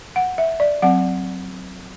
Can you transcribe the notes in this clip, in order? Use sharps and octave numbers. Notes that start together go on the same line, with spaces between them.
F#5
E5
D5
F#3 C4 F#5